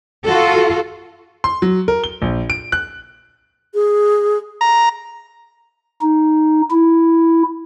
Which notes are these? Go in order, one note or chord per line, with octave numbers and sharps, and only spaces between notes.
F4 F#4 A4
C6
F#3
A#4
G7
A#1
D7
F#6
G#4
A#5
D#4
E4